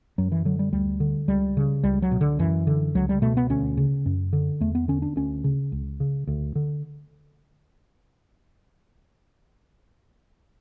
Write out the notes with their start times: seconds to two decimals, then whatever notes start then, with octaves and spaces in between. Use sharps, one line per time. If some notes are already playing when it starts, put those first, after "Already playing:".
0.18 F#2 F#3
0.32 E3
0.45 D3 F#3
0.59 G3
0.72 D2 G3
1.00 D3
1.28 C#2 G3
1.57 C#3
1.83 C#2 G3
2.02 F#3
2.11 B2
2.21 D3
2.39 F#2 E3
2.67 D3
2.95 C#2 F#3
3.09 G3
3.22 B2 A3
3.37 B3
3.50 D2 C#4
3.77 C#3
4.06 F#2
4.33 D3
4.60 E2 A3
4.75 B3
4.88 D3 C#4
5.02 D4
5.16 D2 C#4
5.44 C#3
5.72 C#2
6.00 C#3
6.27 D2
6.55 D3